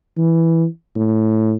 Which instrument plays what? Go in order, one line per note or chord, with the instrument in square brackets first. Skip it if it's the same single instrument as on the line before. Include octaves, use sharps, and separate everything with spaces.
[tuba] E3
A2